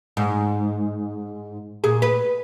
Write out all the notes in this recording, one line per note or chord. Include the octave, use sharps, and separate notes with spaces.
G#2
A#2 G#4
B4